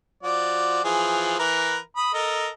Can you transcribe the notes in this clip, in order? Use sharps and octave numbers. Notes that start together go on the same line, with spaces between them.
F3 F#4 D5
E3 F3 G#4
E3 A#4 B4
B5 D#6
A4 A#4 D#5